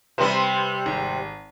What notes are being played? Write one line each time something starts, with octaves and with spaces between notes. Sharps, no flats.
C3 G3 C4 B4 C5
G#1